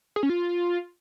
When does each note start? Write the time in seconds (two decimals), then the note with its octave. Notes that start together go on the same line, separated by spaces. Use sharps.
0.16 G#4
0.23 C#4
0.29 F4